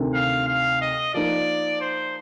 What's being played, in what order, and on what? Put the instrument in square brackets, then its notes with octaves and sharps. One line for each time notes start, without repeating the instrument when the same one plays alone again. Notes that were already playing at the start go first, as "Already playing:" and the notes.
Already playing: [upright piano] D2 C3 D#3
[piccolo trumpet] F5
F5
D#5
[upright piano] F3 A#3 D#4 A#4 [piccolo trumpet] D5
[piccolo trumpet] C5